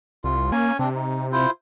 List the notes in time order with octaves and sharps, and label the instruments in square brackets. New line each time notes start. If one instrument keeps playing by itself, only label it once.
[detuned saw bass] C2 [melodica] F4
[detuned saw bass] A#3 [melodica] C#4 G#5
[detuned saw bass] C3 [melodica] C4 D4
[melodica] D#4
E4 F4 C5